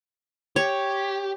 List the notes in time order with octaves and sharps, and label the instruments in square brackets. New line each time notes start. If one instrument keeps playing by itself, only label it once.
[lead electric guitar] G4 [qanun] C#5